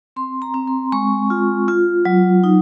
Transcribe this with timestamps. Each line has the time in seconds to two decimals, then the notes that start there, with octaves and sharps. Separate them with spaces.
0.16 C4 C6
0.42 A#5
0.54 C4
0.68 C6
0.92 G#3 C#6
1.30 F4
1.68 F4
2.05 F#3
2.44 D#4